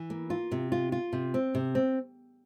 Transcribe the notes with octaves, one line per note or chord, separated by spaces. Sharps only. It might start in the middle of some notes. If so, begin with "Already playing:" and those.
Already playing: E3
A#3
F4
C3
F4
F4
C3
C4
C3
C4